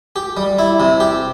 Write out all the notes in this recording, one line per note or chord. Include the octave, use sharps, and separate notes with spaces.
G4
G3
E4
C3
G4